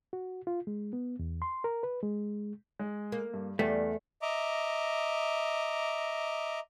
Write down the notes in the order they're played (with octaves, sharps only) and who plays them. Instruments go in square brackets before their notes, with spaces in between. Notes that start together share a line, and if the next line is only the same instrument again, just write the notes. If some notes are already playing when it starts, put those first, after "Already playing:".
[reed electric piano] F#4
F4
G#3
B3
E2
C6
A#4
B4
G#3
[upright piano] G#3
[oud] A#3
[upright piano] G2
[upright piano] E2 [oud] G3 [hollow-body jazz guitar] A3
[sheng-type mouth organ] D#5 E5 A#5 D6